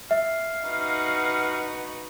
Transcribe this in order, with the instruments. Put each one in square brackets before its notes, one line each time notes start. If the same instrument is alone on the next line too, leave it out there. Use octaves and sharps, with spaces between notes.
[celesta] E5 [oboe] F5
[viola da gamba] D#4 F#4 B4